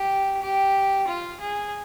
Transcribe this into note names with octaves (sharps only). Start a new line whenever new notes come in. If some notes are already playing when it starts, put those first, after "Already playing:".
Already playing: G4
G4
F4
G#4